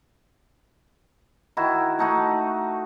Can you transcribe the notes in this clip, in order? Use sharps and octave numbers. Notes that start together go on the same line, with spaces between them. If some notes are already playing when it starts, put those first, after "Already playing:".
D#3 E4 F#4
A3 D#4 F#4